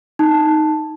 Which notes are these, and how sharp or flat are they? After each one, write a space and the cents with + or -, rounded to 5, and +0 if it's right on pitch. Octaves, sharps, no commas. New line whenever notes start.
D#4 +0 A5 +0